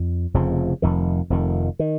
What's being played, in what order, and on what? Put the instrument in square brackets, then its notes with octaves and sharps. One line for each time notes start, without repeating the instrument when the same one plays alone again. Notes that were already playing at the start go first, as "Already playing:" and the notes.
Already playing: [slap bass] F2
F1 F2 C#3 F3
F1 F2 D#3
F1 F2 D#3
D#3